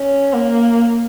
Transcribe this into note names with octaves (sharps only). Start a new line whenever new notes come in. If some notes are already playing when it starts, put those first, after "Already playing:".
Already playing: C#4
A#3